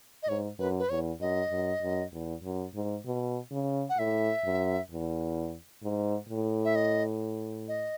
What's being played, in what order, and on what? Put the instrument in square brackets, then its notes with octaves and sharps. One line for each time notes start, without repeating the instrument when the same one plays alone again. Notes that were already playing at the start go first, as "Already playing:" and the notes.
[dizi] D#5
[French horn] G#2 [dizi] C#5
[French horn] F#2 [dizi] B4
[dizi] B4
[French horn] E2 [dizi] C#5
[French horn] F#2 [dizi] D#5
[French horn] F#2
F#2
E2
F#2
G#2
B2
C#3
[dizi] F#5
[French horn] A2 [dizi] E5
[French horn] F#2
E2
G#2
A2
[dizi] E5
D#5
D#5